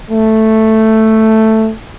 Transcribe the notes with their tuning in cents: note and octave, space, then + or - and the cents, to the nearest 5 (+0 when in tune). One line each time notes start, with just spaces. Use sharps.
A3 +0